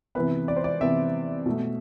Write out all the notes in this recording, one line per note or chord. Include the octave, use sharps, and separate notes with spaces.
C3 E3 B3 B4
D5
C5
D5
C3 E3 B3 E5
B2 A3